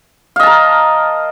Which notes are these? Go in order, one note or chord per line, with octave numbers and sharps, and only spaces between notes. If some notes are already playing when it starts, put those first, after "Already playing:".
A#4 D#5 F5 A5